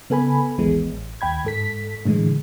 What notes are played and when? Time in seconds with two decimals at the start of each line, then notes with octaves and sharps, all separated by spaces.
0.10 C#3 B3 A4 G#5 B5
0.58 A1 D#2 E3 G#3 B3
0.90 A1
1.21 D#2 G5 B5 G#6
1.45 G#2 A4 B6
2.05 A2 D3 E3 G#3